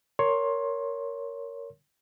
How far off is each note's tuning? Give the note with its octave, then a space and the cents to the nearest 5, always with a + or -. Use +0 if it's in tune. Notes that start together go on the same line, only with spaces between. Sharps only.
A#4 -5 C#5 +15 C6 +20